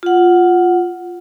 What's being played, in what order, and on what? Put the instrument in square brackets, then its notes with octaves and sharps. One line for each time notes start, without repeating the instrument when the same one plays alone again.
[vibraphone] F4 F#5